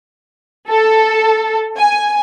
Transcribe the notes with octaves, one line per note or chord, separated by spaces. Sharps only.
A4
G#5